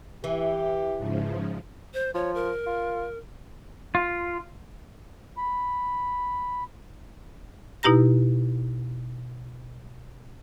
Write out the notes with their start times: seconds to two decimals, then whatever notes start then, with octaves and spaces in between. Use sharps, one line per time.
0.24 E3 G4
0.97 G#2 C#3 F3
1.94 C5
2.15 F3 C#5
2.35 A#4
2.67 F4
3.95 F4
5.37 B5
7.83 B2 D#4 E4 G4 A#5 A#6